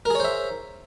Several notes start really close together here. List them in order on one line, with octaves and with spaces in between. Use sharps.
A#4 G#4 C#5 C5 E5